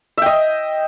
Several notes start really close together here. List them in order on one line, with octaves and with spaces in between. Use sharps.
E5 G5 D#5